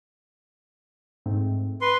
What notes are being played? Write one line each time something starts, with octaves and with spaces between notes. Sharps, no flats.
G#2 A3 C4
B4 C6